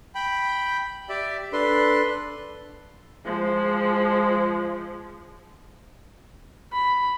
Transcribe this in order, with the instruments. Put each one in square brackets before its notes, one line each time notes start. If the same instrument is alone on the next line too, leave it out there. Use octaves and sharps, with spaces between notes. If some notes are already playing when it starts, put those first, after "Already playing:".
[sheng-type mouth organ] G5 B5
G4 D5 E5
D4 A4 B4 C6
[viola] F3 G#3
[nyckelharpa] B5